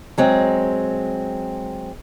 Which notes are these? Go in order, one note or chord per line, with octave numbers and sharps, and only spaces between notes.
F#3 G#3 C4